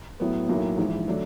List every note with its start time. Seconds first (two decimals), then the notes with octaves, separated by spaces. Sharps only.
0.20 A2 F#3 B3
0.49 B1 A2 F#3 A#3
0.78 A#1 G#2 E3
1.08 D3 F#3 A3 D4